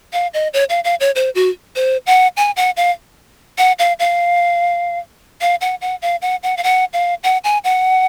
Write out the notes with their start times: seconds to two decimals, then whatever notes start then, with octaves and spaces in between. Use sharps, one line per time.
0.13 F5
0.34 D#5
0.54 C#5
0.69 F5
0.84 F5
1.00 C#5
1.16 C5
1.35 F#4
1.76 C5
2.06 F#5
2.37 G#5
2.56 F#5
2.77 F5
3.58 F#5
3.79 F5
3.99 F5
5.41 F5
5.61 F#5
5.81 F#5
6.02 F5
6.22 F#5
6.43 F#5
6.57 F5
6.64 F#5
6.93 F5
7.24 F#5
7.44 G#5
7.64 F#5